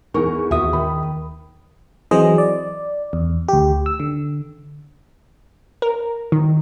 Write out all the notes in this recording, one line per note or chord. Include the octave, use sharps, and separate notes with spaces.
E2 D#4 A#4 C#6
D#2 F4 F#4 E5 D#6
D#3 B5
E3 F#3 C4 G#4 C5 D#5
D5
E2
D2 G4
E6
D3
A#4
D#3